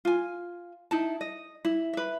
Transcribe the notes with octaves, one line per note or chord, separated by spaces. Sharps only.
F4 G#5
D#4 E4 A5
D#5
E4
B4 E5